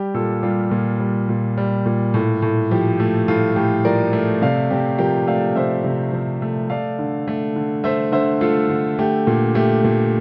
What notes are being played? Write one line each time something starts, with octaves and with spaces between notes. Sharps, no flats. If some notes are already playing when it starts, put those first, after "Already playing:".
Already playing: G3 G4
A#2 F4 A4
G3 F4
A#2
G3
A#2
G3
A#2
A2
A2
F3 G4
A3
A2 F4
A2 G4
F3 A#4 D5
A3
C3 D5 F5
C3 G4
F3 G4 A#4
A3 D5 F5
C3 C5 E5
C3
F3
A3
A3 D5 F5
D3
A3
D3
A3 C5 E5
D3 C5 E5
A3 F4 A4
D3
A3 G4
A#2
A3 G4
A#2